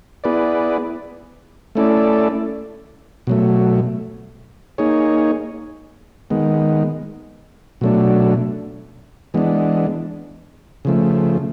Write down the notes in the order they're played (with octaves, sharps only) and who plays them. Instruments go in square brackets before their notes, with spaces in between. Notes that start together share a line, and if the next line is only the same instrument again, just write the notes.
[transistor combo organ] B3 E4 G#4 B4 D5
A3 C#4 E4 A4 D5
B2 F#3 A3
A#3 D#4 G#4 C#5
D#3 G#3 B3
B2 F#3 A3 D4
E3 G#3 B3 D4
C#3 F3 A3